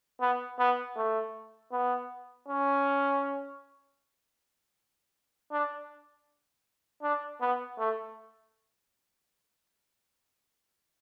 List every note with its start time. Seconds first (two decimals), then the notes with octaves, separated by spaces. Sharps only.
0.21 B3
0.59 B3
0.97 A3
1.72 B3
2.48 C#4
5.52 D4
7.02 D4
7.41 B3
7.78 A3